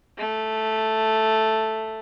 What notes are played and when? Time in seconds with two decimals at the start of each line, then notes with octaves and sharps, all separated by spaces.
0.18 A3